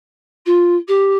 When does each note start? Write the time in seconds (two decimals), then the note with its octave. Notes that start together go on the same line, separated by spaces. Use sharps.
0.46 F4
0.88 G4